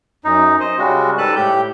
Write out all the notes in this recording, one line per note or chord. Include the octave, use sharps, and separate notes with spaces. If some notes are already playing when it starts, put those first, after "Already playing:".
F#2 D#4
C5 D#5
C#3 G3 G#3 F#4
G#2 G3 A4 B4 A5 F#6
A2 G4 G6